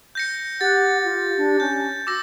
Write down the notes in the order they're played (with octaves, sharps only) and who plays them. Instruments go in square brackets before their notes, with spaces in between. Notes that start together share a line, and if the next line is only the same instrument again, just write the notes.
[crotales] G6 A#6 C#7
[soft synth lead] G4 [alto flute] F#5 [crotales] A6
[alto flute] F4
D4
[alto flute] C#4 [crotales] G6
[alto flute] F#4 [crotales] D6 E6 A#6